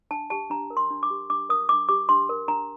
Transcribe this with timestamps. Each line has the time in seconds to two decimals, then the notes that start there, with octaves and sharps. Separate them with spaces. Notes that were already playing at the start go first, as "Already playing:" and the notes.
0.11 D4 A5
0.30 G4 A5
0.50 D4 A#5
0.70 A#4
0.77 C6
0.91 D4
1.03 D6
1.10 G4
1.30 D4 D6
1.49 A#4 D#6
1.69 D4 D6
1.89 G4 D6
2.09 D4 C6
2.29 A#4
2.48 D4 A#5